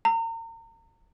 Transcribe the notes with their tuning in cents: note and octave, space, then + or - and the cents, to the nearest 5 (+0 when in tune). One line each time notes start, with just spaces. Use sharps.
A#5 -35